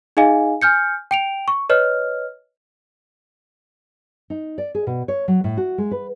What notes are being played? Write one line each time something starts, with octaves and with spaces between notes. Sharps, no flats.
D#4 G#4 D#5 F5 G#5
G#5 F6 G6 C#7
G5 D7 F7
C#6
B4 C#5 D#5 F6
D#4
D5
G#4
B2
C#5
F#3
A2
F#4
G#3
B4